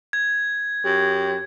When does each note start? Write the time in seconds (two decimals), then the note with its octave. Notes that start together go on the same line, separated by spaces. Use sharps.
0.13 G#6
0.85 F#2 G4